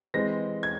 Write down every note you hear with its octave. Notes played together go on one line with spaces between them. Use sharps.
E3 G#3 C4 A#6
G#6